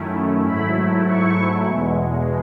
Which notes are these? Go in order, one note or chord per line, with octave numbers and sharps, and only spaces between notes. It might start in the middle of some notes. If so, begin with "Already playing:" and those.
Already playing: F#2 D#3 A3 C#4 E4
G#2 F#3 A3 E4 B5
C#6
E2 B2 G#3